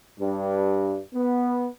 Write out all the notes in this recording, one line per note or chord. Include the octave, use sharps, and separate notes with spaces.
G2
B3